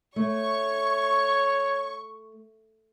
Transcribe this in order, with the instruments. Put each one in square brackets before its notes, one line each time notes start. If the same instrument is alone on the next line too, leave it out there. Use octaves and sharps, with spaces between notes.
[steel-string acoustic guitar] A3 [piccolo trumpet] C#5 [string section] C#6